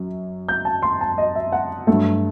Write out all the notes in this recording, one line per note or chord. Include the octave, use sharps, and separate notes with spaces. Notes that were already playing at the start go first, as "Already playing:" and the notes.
Already playing: F#2 F#3
G6
A5
C6
A5
D#5
E5
F#5
G2 F#3 A3